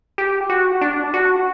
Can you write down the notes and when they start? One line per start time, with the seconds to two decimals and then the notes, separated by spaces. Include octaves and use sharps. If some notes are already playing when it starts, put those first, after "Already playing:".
0.18 G4
0.50 F#4
0.81 D4
1.14 F#4